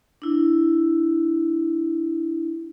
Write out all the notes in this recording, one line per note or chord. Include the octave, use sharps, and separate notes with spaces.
D4 E4